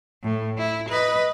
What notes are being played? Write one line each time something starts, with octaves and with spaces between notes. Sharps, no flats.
A2
E4
B4 D#5